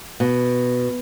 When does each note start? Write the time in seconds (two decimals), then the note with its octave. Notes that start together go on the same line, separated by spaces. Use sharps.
0.20 B2